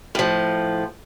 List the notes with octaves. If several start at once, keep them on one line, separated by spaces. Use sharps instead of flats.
A2 F3